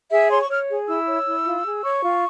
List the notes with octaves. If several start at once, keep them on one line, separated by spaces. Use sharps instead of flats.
G#4 E5
C#5 C6
C#6
C#5 F6
G#4
E4 E6
C#5
E4
F4
G#4
C#5 C#6
F4